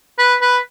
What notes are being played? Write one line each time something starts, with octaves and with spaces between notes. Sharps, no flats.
B4
B4